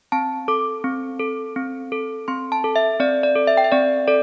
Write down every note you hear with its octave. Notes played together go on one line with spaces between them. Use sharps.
C4 A5
A4 D6
C4
A4
C4
A4
C4 C6
A5
A4
E5
C4 D5
D5
A4
E5
G5
E5
C4 D5
A4 D5